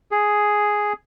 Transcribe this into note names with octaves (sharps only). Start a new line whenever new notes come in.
G#4